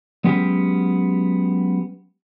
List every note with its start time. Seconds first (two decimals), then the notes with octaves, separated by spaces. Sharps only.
0.24 F#3 G#3 B3 C#4 G4